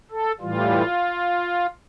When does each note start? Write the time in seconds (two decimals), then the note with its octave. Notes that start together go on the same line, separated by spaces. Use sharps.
0.11 A4
0.41 A2 E3 G3 F4